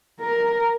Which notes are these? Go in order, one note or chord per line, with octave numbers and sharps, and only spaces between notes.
A#4